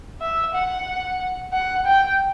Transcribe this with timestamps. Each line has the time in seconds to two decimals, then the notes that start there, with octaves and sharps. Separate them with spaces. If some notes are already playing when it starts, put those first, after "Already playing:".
0.21 E5
0.54 F#5
1.53 F#5
1.86 G5